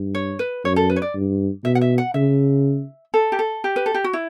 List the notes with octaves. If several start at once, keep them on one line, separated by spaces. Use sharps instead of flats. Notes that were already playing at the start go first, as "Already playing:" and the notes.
Already playing: G2
C#5
B4
F#2 C#5
A4
B4
C#5
D5
G2
B2 E5
F#5
E5
F#5
C#3 E5
A4
G4
A4
G4
B4
A4
G4
F#4
E4